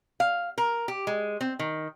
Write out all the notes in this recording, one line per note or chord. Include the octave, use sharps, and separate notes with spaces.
F5
A#4
G4
G#3
C4
D#3